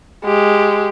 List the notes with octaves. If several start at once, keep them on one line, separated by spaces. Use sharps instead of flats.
G#3 G4